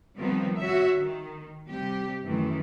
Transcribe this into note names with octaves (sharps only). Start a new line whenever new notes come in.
D#3 F3 G3 B3 C4
F#4 C#5 E5
D#3
C3 G3 G4
F#2 D#3 E3 A3